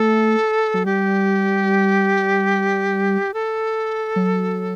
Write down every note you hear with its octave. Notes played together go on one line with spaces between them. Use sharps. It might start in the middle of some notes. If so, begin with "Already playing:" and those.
Already playing: A3 A4
F#3
G3 G4
A4
F#3